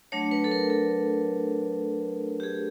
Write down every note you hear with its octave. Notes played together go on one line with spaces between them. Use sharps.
F#3 A3 D4 C#5
B4
A4
A#4
A4
G4
G#4